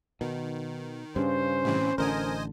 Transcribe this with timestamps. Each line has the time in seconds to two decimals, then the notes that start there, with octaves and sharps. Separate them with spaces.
0.21 B2 D#3
1.16 G2 C#3 C#4 C5
1.65 A2 C3 E3
1.98 A1 D3 A#4 C5 D#5 G#5